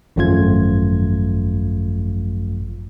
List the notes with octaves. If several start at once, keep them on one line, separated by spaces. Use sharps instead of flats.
G#1 F#2 F3 A3 F4 G#6